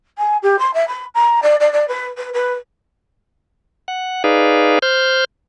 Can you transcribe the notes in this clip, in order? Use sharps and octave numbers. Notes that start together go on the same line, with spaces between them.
G#5
G4
C6
E5
B5
A#5
D5
D5
D5
B4
B4
B4
F#5
D#4 G#4 B4 D5 F5
C5 F6 G6